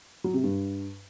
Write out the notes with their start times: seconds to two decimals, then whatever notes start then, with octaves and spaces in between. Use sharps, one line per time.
0.24 F#3
0.34 C3
0.44 G2